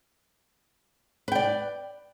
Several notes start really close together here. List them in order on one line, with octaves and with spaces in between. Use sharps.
B4 G5 D5